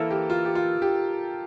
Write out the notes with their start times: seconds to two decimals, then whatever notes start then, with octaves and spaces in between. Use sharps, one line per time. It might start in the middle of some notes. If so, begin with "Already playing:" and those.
Already playing: E3 A#3 E4 A4 A#4
0.10 G4
0.30 F4
0.45 G4
0.55 F4
0.82 G4